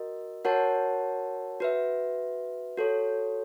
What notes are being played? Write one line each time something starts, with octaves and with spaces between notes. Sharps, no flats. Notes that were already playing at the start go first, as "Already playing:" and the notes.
Already playing: F#4 A#4 D#5
F#4 A#4 C#5 F#5 A5
F#4 B4 E5
F#4 A4 C#5